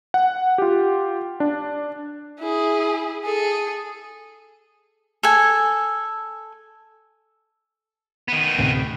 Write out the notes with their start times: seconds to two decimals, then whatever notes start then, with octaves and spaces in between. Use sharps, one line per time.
0.14 F#5
0.58 F4 G4
1.40 D4
2.39 E4 G#4
3.24 G#4 A4
5.23 A4 G#5
8.28 D#3 B3
8.58 D2 A2 C3